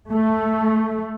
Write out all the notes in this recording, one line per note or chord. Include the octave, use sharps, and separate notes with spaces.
A3